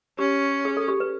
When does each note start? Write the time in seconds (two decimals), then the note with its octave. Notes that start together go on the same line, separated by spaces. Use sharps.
0.19 C#4 G4
0.65 G#4
0.77 A4
0.88 G4
1.00 B4